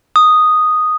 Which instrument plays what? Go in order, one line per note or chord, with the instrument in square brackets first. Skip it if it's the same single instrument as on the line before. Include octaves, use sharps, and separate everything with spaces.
[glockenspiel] D#6